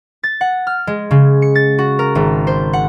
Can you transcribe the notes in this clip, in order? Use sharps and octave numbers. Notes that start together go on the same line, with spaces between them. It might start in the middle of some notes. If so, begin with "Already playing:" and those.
A6
F#5
F6
G#3
C#3
C#7
A6
F#4
A#4
G#1
C5
F#5